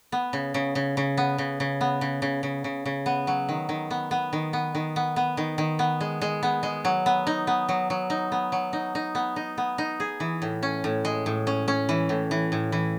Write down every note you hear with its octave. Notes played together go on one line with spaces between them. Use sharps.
B3
C#3
C#3
C#3
C#3
B3
C#3
C#3
B3
C#3
C#3
C#3
C#3
C#3
B3
F#3
D#3
D#3
B3
B3
D#3
B3
D#3
B3
B3
D#3
D#3
B3
G#3
G#3
B3
G#3
F#3
B3
D#4
B3
F#3
F#3
D#4
B3
F#3
D#4
D#4
B3
D#4
B3
D#4
G#4
E3
A2
C#4
A2
G#3
A2
C#4
C#4
E3
A2
E3
A2
E3